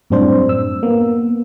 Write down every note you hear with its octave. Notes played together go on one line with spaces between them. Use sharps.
F#2 A2 G3 C4 D4 C5
E6
A#3 B3